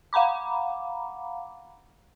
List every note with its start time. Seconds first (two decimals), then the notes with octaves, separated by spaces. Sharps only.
0.13 F5 F#5 A#5 B5 D6